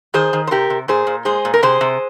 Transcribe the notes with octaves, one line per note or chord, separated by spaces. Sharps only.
D#3 G#4 C5
D#3
C5
C3 G4 A#4
C3
A#2 G#4 C5
A#2
G#3 G#4 C5
A#2
A#4
C3 G#4 C5
C3